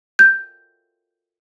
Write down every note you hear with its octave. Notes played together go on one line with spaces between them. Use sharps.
G6